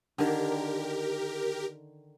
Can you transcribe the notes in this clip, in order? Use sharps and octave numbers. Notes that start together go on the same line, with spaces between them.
D3 D#3 G4 A#4